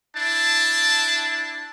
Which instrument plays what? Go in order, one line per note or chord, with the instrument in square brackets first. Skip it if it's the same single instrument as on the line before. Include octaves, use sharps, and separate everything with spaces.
[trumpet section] D4 E4 A5